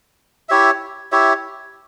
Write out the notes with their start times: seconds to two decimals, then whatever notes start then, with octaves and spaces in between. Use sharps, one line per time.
0.49 E4 G4 C#5 E5
1.12 E4 G4 C#5 E5